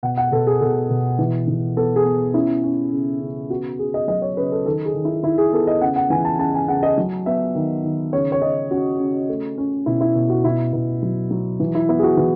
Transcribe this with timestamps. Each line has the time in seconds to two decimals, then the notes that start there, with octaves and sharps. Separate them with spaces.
0.03 B2 F#5
0.17 F#5
0.32 B2 A4
0.47 G#4
0.61 B2 A4
0.90 B2
1.19 E3
1.48 E3
1.77 B3 A4
1.96 G#4
2.05 B3
2.34 C#4 E4
2.63 C#4
2.92 C#3
3.21 C#3
3.50 B3 F#4
3.79 C#3 G#4
3.94 D#5
4.08 F#3 D#5
4.22 C#5
4.37 C#3 B4
4.52 A4
4.65 D#3 A4
4.85 G#4
4.94 D#3
5.05 E4
5.23 D#3 E4
5.38 G#4
5.53 B3 A4
5.67 D#5
5.81 C#3 F#5
5.96 F#5
6.10 E3 G#5
6.25 A5
6.39 C#3 A5
6.54 G#5
6.68 C#3 F#5
6.83 D#5
6.98 F#3
7.26 B3 E5
7.55 D#3
7.84 D#3
8.13 C#3 C#5
8.32 C#5
8.42 C#3 D#5
8.71 C#4 F#4
9.00 C#3
9.29 A3
9.58 C#4
9.86 B2 E4
10.01 E4
10.15 B2
10.30 F#4
10.44 B2 E4
10.73 B2 E4
11.03 F#3
11.31 F#3
11.60 E3
11.75 E4
11.89 B3 E4
11.99 G#4
12.03 F#4
12.17 E3